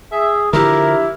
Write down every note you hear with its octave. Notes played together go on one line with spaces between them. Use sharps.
G#4 E5
D3 F3 E4 G4 A#4